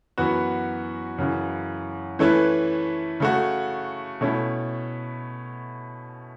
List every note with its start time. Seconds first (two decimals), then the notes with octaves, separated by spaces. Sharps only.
0.18 F#2 E3 B3 F#4
1.18 F#2 C#3 E3
2.19 E3 A3 C#4 E4 B4
3.20 C#3 A3 F#4
4.21 B2 A3 C#4 E4